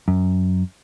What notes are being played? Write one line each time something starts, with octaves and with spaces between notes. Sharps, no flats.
F#2